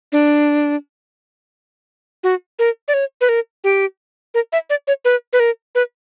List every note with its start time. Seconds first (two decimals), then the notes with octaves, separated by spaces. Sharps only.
0.12 D4
2.23 F#4
2.59 A#4
2.88 D5
2.94 C#5
3.21 B4
3.29 A#4
3.64 G4
4.34 A#4
4.53 E5
4.70 D5
4.87 C#5
5.05 B4
5.33 B4
5.40 A#4
5.75 B4